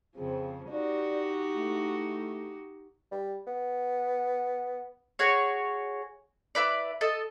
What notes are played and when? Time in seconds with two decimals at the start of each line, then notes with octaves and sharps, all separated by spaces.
0.16 F2 C#3 F3 C4 G#4
0.69 D#4 F#4 G4 D5
1.55 A3 E4
3.12 G3
3.47 B3
5.19 F#4 G#4 C#5
6.55 E4 B4 D5
7.01 A4 D#5